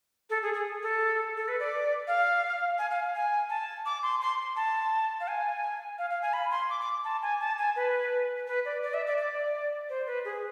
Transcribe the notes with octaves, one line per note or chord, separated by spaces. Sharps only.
A4
G#4
G#4
A4
A4
B4
D5
F5
G#5
F5
G#5
A5
D6
C6
C6
A5
F5
G#5
F5
F5
G#5
B5
C6
D6
D6
A5
G#5
A5
G#5
B4
B4
D5
D5
E5
D5
D5
C5
B4
G#4